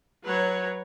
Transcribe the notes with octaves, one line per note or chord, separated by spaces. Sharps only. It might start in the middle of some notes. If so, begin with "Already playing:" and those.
F#3 B4 C#5 A#5